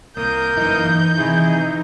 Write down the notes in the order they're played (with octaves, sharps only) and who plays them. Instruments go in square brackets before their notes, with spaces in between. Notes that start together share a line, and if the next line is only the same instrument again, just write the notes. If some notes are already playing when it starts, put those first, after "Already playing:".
[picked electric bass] C2 [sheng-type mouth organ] A#3 A#4 D#6 [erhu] G6
[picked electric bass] G1 F#2 [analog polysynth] E3 D#4
[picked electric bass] C3 D#3 [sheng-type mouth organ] E4 G#4